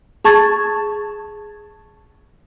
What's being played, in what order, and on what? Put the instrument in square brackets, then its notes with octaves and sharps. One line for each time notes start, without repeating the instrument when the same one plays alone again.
[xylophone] G#4 A5 C#6 G#6 A6